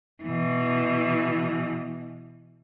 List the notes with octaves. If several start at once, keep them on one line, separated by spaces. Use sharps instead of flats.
B2 E3